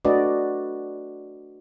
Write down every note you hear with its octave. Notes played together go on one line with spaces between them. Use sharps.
A3 D4 F#4 B4 D5 D#5